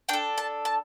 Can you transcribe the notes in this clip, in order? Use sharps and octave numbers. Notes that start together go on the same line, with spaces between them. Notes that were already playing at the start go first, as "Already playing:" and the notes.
D4 A4 G5
A5
A5